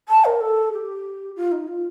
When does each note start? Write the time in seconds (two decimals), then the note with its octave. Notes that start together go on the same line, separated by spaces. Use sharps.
0.08 A5
0.25 A#4
0.40 A4
0.72 G4
1.36 F4
1.51 D#4
1.67 F4